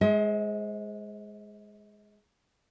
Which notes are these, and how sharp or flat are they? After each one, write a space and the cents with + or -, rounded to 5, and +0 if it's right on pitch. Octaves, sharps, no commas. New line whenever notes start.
G#3 +0 C5 +10 D#5 +45